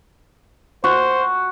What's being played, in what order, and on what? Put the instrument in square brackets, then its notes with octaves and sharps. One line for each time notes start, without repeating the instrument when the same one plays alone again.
[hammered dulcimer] F#4 [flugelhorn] C5